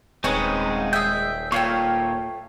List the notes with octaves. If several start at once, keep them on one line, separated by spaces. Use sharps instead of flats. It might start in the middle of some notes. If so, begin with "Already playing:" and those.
D#1 G#3 C4 C#4 D#4 B4 C#5 G#5
G#4 E5 G5 D#6
A#2 A3 F4 C#5 F5 G5 C#6